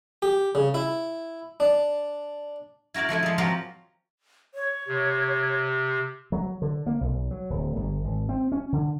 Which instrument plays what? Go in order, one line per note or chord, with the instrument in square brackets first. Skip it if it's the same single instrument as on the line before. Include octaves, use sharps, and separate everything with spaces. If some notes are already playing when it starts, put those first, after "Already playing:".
[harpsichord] G4
C#3
E4
D4
[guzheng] E4 F#4 A#4 D5 F5
F3 A3 E4 F4
F3 G#3
F3 F#3 C4 G4 A#4
[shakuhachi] C#5
[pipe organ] C3
[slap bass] F#3
D3
A#3
B1
F#3
D1
G1
G#1
C4
C#4
D3